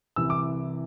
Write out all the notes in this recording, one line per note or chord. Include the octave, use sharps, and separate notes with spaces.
C2 C3 E3 E6
D6